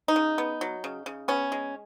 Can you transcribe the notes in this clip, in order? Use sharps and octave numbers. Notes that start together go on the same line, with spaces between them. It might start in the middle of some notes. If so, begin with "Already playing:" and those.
D#4
C#3
B3
F#3
C#3
C#3
B3 C#4
G#3